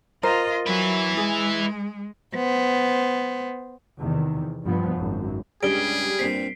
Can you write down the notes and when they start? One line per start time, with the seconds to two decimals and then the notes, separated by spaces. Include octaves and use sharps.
0.23 F4 A#4 C5 D#5
0.67 F#3 E4 B4
1.17 G#3 G#4
2.34 B3 C5
3.98 E2 C3 D#3
4.64 G2 F3 B3
4.94 G#1 F#2
5.63 C#2 G2 G3 G#4 D7 G7
6.19 G2 A#2 C4 B6 C7